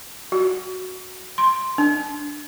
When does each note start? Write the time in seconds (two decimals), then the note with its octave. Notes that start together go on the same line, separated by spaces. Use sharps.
0.32 F#4
1.38 C6
1.78 D4